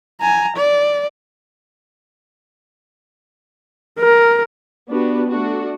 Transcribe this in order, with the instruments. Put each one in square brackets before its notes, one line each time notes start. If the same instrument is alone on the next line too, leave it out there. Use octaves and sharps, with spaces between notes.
[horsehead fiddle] G#5 A#5
D5
A#4
[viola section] B3 D4 F#4 G4 B4
A3 D4 F#4